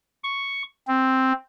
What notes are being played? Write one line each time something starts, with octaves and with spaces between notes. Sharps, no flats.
C#6
C4